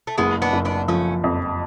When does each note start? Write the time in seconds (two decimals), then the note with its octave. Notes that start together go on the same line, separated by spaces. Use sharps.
0.07 A3
0.18 F#1 G#3 B3
0.42 B3 D4
0.53 F#1
0.65 B3 D4
0.88 F3 A3 C#4
1.24 F2